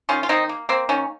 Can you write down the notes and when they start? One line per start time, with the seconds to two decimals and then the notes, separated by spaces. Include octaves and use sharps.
0.09 D#3 C#4 F4
0.23 F4
0.29 D#3 C4 D#4
0.49 A#3
0.69 A#3 C4
0.89 D#3 C#4